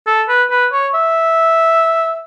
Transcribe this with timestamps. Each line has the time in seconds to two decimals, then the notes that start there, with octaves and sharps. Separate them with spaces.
0.07 A4
0.29 B4
0.51 B4
0.73 C#5
0.95 E5